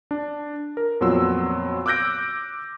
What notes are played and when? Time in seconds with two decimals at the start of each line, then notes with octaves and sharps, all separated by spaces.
0.11 D4
0.77 A#4
1.01 F2 A#2 F#3 B3 C6 E6
1.86 D6 E6 F#6 G6 A#6 D7